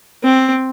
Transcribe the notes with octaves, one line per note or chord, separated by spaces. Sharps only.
C4